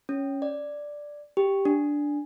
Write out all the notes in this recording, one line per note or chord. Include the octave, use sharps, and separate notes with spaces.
C#4
D5
G4
D4